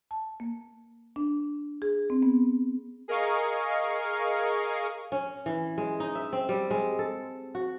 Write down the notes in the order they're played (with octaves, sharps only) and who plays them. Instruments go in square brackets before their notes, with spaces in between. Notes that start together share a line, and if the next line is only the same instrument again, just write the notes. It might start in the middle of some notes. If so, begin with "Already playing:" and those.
[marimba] A5
A#3
D4
G#4
C4
B3
[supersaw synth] G#4 A#4 D#5 F5 C#6
[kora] C#4
E3
G#3
D#4
E5
C4
G3
G#3
A4
F#4